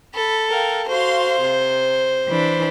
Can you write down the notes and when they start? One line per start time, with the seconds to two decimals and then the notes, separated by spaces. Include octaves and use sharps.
0.14 A4 B5
0.49 A#4 F5 G5
0.88 F#4 C5 F5 C6
1.41 C3
2.29 E3 D4 B5